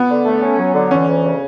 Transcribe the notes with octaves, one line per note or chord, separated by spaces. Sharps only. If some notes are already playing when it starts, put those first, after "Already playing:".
Already playing: B3
D3
A3
C#4
F#3
D3
E3 C#4
D2
C#3